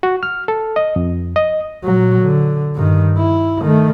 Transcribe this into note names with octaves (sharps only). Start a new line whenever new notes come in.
F#4
F6
A4
D#5
F2
D#5
A#2 F#3
D3
G2 D#3
E4
D#3 A3